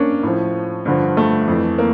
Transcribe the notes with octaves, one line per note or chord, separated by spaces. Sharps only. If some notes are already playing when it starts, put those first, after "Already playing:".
Already playing: A#3 C#4 D4
A2 F3
G2 D3 F3
A3
F2 E3
A#3